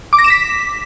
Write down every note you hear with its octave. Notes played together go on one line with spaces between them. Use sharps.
D6
A#6
E7
B6